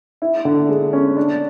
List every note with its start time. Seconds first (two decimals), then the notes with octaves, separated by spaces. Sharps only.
0.22 E4
0.45 D3
0.69 G#3
0.93 C#4
1.17 D4